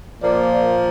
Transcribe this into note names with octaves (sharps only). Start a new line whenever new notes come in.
A#2 F3 A#3 D5